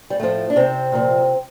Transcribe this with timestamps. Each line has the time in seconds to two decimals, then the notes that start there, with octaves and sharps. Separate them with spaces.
0.10 G3
0.20 A2 F3 A3
0.50 D4
0.56 C3 C4
0.92 A#2 F3